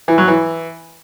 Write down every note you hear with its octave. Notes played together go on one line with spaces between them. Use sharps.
E3
F#3
E3